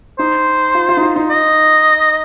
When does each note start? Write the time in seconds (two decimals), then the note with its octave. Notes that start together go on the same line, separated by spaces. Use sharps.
0.19 D#4 C5
0.75 F4
0.89 F4
0.97 D#4
1.02 F4
1.16 D#4
1.30 D#5